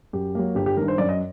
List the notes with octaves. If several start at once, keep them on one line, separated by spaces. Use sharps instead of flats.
F#2 G4
F#3 A#3
G1 G4
G4
G2 D#3 A#4
C5
F#2 D5
D#5